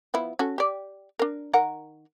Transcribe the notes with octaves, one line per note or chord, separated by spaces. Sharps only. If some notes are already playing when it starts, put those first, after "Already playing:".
F3 B3 E4
C#4 F#4 A4
G4 D5
D4 A#4
D#3 A#4 F#5